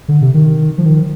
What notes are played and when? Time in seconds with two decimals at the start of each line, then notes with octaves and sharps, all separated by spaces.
0.08 D3
0.21 C3
0.34 D#3
0.78 F3
0.85 D#3